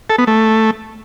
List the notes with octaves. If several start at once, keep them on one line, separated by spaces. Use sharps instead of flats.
A4
B3
A3